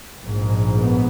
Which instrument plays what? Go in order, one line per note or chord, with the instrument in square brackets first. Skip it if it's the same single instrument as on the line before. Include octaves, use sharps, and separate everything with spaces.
[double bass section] A#1 G#2
B3